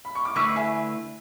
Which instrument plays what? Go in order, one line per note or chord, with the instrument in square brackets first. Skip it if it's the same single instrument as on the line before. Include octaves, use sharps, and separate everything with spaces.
[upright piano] B5
C#6
D6
[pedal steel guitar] D3 A3 E4 B4 [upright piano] C#6 E6
[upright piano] E5 G#5